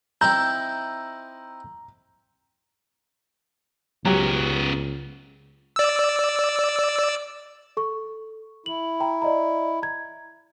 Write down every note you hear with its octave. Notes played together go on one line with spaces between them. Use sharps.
C4 D#4 E4 A#5 G6
C#2 F#3 B3 C#4 G4
D5 E6
A4 C#6
E4 F#7
G5 A#5 B5
D5 D#5 A#5
A#5 G#6